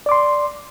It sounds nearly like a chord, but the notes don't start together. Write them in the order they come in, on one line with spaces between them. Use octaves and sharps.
D5 D6 C6